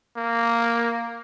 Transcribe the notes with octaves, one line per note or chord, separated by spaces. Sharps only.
A#3